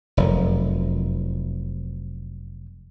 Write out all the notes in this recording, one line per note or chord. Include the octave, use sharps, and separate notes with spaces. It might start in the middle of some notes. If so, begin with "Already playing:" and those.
F1 F#2